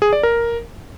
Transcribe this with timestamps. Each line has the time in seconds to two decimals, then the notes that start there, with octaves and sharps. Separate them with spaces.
0.02 G#4
0.13 D5
0.23 A#4